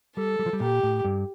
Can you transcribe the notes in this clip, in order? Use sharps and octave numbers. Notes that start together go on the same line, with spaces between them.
G3 A4
G3
F3
G3
A#2 G4
A2
G2